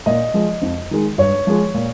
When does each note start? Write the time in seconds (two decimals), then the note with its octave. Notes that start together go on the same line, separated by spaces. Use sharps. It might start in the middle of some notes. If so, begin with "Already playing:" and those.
0.06 A#2 D#5
0.34 F3 G#3
0.62 F2
0.91 D#3 G#3
1.18 G2 C#5
1.47 F3 G#3
1.74 A#2